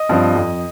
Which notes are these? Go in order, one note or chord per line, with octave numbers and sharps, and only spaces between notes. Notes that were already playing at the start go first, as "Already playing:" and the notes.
Already playing: D#5
G2 F3 C4
F2